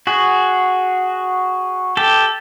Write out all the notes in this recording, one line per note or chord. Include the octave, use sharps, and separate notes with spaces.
F#4 G#4
G4 A4